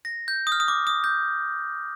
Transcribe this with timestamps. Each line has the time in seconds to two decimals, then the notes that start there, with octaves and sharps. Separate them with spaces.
0.05 A#6
0.28 G6
0.47 D#6
0.52 F6
0.60 D#6
0.68 D6
0.87 D#6
1.04 G6